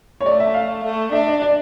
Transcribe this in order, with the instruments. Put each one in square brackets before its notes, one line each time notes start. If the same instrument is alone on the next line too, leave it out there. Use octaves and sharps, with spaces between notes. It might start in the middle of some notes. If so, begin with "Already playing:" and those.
[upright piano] C#5
[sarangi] A3 [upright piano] D5
[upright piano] E5
F5
[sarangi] A3
[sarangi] D4 [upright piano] E5
[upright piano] D#5
D5